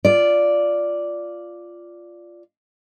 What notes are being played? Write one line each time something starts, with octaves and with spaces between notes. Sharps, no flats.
F4 D5